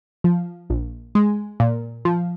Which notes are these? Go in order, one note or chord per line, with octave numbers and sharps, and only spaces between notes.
F3
A#1
G#3
A#2
F3